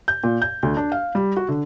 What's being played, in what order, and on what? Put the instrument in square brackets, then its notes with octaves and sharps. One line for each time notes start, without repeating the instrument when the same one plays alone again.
[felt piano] G6
A#2
G6
D2
D4
F5
G3
F#4
D3